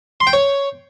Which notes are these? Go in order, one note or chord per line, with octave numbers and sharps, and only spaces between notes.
C6
G5
C#5